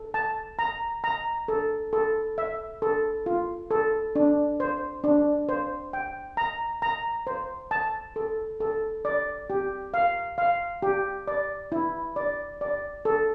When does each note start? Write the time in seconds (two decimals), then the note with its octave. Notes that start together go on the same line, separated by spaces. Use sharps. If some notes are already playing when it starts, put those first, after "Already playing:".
Already playing: A4
0.14 A5
0.59 A#5
1.04 A#5
1.48 A4
1.93 A4
2.38 E5
2.82 A4
3.26 F4
3.71 A4
4.15 D4
4.60 C5
5.04 D4
5.49 C5
5.93 G5
6.37 A#5
6.82 A#5
7.27 C5
7.71 A5
8.16 A4
8.60 A4
9.05 D5
9.50 G4
9.94 F5
10.38 F5
10.82 G4
11.27 D5
11.72 E4
12.16 D5
12.61 D5
13.05 A4